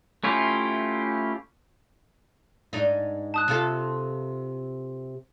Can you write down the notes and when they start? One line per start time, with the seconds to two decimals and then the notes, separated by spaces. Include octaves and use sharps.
0.24 A3 C#4 E4 F4 G4
2.73 G#2 D4 D#4
3.34 A5 D#6 F#6
3.48 C3 F4 A4